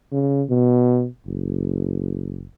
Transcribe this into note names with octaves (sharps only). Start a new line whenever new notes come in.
C#3
B2
F#1